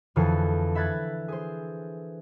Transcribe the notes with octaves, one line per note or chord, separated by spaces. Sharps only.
F2 D3 E3 G#4 F6 C7
E5 B5 F#6 G#6 A6
G#4 C5